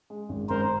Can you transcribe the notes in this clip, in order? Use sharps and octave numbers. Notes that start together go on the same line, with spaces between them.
G#3
G#1
G#1 A#4 C5